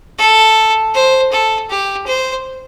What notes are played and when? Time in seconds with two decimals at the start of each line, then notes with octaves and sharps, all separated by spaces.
0.18 A4
0.94 C5
1.32 A4
1.70 G4
2.07 C5